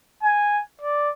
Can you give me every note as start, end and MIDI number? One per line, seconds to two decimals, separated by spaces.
0.23 0.62 80
0.81 1.09 74